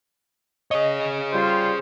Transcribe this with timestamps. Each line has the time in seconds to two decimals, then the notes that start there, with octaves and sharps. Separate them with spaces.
0.71 G#4 C#5 D#5
1.32 G3 F4 C5